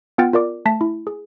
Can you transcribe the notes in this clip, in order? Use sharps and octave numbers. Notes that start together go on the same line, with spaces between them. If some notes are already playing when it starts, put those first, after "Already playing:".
B3 F4 F#5 G5 F6 A6
F4 A#4 D5 D6
A3 A5 B6
E4
G#4